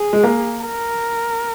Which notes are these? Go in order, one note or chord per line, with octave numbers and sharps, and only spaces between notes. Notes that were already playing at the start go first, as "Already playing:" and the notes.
Already playing: G#4
G#3
A#3
A#4